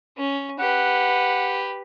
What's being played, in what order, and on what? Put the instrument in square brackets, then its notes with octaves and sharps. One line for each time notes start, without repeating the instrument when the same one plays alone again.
[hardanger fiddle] C#4
[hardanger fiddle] G4 B4 [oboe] F#5